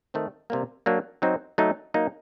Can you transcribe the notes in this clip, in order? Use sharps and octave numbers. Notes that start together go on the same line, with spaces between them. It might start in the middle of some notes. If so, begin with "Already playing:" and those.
D#3 A3 C4
C3 G3 A#3
F#3 A#3 D4
F#3 C4 D#4
F#3 A3 D#4
F#3 A#3 D#4